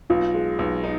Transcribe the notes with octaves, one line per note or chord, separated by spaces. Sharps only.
B1 F4
G#3
B1
D#4